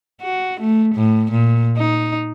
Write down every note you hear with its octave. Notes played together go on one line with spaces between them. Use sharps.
F#4
A3
A2
A#2
D#4